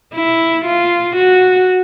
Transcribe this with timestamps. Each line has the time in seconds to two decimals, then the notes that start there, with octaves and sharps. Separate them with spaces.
0.14 E4
0.66 F4
1.16 F#4